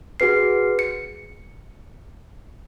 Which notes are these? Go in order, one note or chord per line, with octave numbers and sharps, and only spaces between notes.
F#4 G#4 B4 C7
C#7